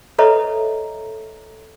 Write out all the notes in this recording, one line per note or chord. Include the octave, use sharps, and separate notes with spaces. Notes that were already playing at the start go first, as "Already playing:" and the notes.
A4 B4 C#5 D#5 E5 A#5